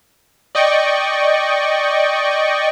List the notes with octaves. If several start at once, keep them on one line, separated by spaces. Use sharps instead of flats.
D5 D#5 G5 C#6